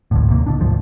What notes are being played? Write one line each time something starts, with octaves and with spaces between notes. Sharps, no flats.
G#1 D2 A2
D#2 C3 A#3
A#1 B2 D3 D4
G#1 D2 F3